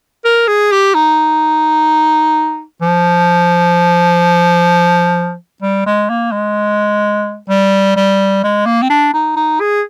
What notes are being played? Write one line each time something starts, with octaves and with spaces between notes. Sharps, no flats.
A#4
G#4
G4
D#4
F3
G3
G#3
A#3
G#3
G3
G3
G#3
A#3
C4
D4
D#4
D#4
G#4